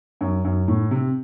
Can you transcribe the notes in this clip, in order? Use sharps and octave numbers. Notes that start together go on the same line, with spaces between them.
F#2
F#2
A2
C3